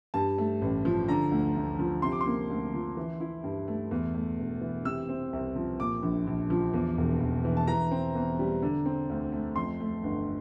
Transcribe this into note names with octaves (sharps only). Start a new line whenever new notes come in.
G2 A5
A3
A1
F3
D3 A#5
D2
D2
F3
C3 C6
D6
C6
A#3
D2
F3
E3
E4
G2
A3
E2
A3
E1
E3
C3 E6
C4
C2
F3
A#2 D6
A#1
A#1
F3
E2
E1
E1
E3
A5
E3 A#5
C4
E2
G3
D3
C4
D2
A3
F2 C6
A3
G1